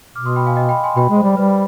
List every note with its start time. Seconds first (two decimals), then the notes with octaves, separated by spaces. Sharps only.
0.15 B2 D6 F6
0.26 C6 D#6
0.36 G5 B5
0.46 F5 G#5
0.56 D#5 G5
0.69 G5 B5
0.84 G#5 C6
0.96 B2 G5 B5
1.10 G#3
1.16 C5
1.23 G3
1.36 G3 B4